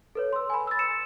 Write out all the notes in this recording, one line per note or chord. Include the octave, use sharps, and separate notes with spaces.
A4 B4 C#5
C6 E6
G#5 B5
E6 A6
E6 C#7 E7